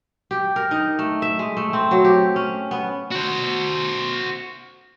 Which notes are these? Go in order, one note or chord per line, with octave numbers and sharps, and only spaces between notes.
G4
A#4
D#4
A3
E5
G#3
A3
C4
F#3
G4
C#4
B3
F#4 C5